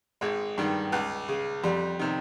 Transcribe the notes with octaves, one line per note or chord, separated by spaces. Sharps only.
G#1 G#3
G2 D#3
C#2
C#3
F2 G3
C3 D#3